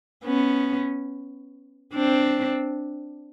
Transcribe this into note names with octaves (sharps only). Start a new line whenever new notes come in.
B3 C#4
C4 D4